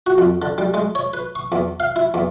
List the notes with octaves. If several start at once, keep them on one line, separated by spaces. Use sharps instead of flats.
F#4
F2
D3
G3
G#3
C#5
B4
C#6
E2
F5
E4
E2